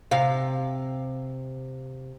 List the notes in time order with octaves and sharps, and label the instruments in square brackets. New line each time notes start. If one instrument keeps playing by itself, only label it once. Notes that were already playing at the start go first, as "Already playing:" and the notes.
[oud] C3 F5